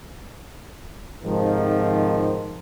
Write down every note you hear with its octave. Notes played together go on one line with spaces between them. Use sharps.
G#2 C3 D#3 F3